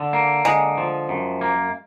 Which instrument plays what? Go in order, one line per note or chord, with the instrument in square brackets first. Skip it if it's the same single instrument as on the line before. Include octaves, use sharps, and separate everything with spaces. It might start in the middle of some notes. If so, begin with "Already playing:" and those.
Already playing: [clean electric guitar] D3
A#3
[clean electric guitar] D3 [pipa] G#3
[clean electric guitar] F3
F#2
A#3